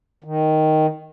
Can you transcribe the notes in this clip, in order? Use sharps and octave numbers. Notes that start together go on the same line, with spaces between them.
D#3